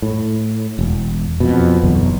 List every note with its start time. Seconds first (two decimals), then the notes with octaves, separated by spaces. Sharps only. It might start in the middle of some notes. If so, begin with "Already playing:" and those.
0.02 A2
0.79 E1
1.40 F2 B2
1.83 F#1 B1 E2